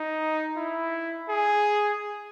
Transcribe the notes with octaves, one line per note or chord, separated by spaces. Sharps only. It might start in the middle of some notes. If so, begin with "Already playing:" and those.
Already playing: D#4
E4
G#4